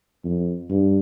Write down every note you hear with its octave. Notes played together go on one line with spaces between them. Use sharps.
F2
G2